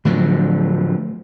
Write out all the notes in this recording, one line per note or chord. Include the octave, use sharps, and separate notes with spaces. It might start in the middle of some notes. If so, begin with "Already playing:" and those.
A2 D3 F3 F#3